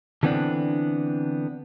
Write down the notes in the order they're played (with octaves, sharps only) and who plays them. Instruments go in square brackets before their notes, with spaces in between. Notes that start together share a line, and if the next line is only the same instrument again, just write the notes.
[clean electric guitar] D3 E3 B3 C4 D4